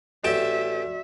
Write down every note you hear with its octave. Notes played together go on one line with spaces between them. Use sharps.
A1 F#4 D5 E5 G5 A5